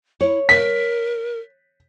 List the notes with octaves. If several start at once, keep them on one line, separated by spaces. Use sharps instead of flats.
E4 C#5
A#4 B6